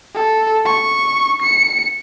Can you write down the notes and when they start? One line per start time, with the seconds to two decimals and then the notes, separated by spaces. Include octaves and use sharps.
0.15 A4
0.66 C#6
1.42 C#7